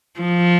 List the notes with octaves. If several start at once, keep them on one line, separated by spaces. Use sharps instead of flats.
F3